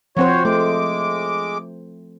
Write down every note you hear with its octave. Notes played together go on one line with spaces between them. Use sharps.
F3 C4 F#4 C5 C#5
G#3 A3 D6